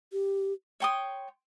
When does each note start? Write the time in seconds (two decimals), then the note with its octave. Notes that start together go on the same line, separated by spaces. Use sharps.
0.13 G4
0.80 C#5 G5 C6 D#6